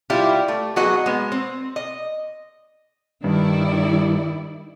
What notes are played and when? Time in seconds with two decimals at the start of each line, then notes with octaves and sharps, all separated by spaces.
0.10 G3 E4 F4 G4
0.48 A3
0.76 F#3 B3 F#4 G#4 D#5
1.06 G#3 B3
1.32 C4
1.76 D#5
3.24 G2 D#3 E4 D5